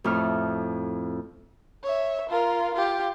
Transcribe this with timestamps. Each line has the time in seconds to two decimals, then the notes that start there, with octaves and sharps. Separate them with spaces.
0.04 F2 A2 F6
1.84 C#5 E5
2.29 F4 A#4
2.74 F4 G4